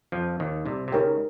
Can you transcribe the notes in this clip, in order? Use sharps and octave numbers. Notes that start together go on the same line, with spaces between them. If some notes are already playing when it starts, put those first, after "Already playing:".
F2 F3
D#2 D#3
C2 C3
C3
C#2 C#3 D#4 G4 A#4 C#5 G5